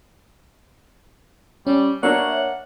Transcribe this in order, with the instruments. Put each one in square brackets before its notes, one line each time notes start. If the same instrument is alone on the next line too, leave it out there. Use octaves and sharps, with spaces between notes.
[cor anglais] G3 [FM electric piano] C#4
[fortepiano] A#3 D4 [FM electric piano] C#5 E5 [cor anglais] F#5